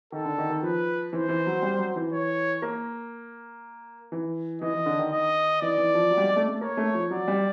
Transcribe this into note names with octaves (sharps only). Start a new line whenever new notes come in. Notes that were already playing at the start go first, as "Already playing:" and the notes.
D#3 A4
D3
D#3
D#3
F3 B4
E3 C5
E3
F#3
G3
F#3
E3
C#5
A#3
E3
E3 D#5
E3
D3
D#3
D#3 D#5
E3 D5
E3
F3
F#3
G3
G#3
A3
A3
A#3 C#5
A3
F3
F#3 D5
G3